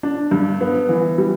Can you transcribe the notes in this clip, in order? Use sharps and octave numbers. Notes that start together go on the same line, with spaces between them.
D4
G2
B3
E3
G3